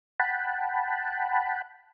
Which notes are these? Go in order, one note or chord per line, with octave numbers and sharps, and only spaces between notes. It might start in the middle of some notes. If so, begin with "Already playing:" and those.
F#5 G5 A5 B5